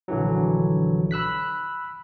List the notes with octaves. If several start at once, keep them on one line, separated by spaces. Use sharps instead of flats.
A#1 D3 E3 F#3
B5 E6 F#6 B6